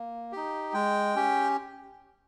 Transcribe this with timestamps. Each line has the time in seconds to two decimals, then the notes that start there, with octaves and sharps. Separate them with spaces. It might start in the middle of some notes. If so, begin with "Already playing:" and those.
Already playing: A#3
0.32 D#4 G4
0.74 G#3 G5
1.15 C#4 G4